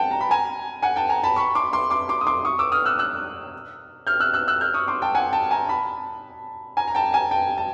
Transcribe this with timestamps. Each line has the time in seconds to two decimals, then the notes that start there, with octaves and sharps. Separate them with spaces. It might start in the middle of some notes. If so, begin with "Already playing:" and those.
Already playing: F#5 G5 A5
0.11 A#5
0.21 B5
0.31 G#5 A#5
0.82 F#5 G#5
0.96 G5 A5
1.09 G#5 A#5
1.24 A5 B5
1.36 B5 C#6
1.55 C6 D6
1.73 C6 D6
1.90 C6 D6
2.09 C6 D6
2.21 D#6
2.27 C6 D6
2.45 C#6 D#6
2.59 D6 E6
2.72 D#6 F6
2.86 E6 F#6
2.99 E6 F#6
4.07 F6 G6
4.20 E6 F#6
4.34 E6 F#6
4.48 E6 F#6
4.61 F6 G6
4.74 C#6 D#6
4.88 C6 D6
5.02 G5 A5
5.15 F#5 G#5
5.33 G5 A5
5.51 G#5 A#5
5.69 A5 B5
6.77 G#5 A#5
6.88 A#5
6.95 G5 A5
7.13 G#5 A#5
7.31 G5 A5
7.58 A5